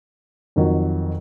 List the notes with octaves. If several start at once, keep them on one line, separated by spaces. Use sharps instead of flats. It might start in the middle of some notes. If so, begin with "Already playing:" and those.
F2 D#3 F#3